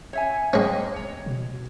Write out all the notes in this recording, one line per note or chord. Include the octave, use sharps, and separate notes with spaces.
C#5 E5 G#5
G#3 A#3 C#4 D#5 G5
D#1 C#5
B2